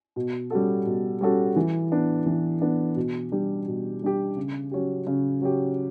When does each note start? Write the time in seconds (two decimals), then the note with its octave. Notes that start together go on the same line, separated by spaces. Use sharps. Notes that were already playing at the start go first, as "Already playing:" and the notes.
0.16 B2
0.50 G3 C#4 F#4 A4
0.86 B2
1.21 G3 C#4 F#4 A4
1.56 E3
1.92 B3 D4
2.26 E3
2.61 B3 D4
2.96 B2
3.32 G3 D4 G4
3.67 B2
4.02 G3 D4 G4
4.37 C#3
4.71 F#3 C#4 G4
5.07 C#3
5.42 F#3 C#4 G4